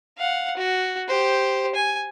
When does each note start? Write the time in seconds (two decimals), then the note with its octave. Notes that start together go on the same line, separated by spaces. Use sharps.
0.18 F5 F#5
0.57 F#4
1.08 G4 C5
1.75 G#5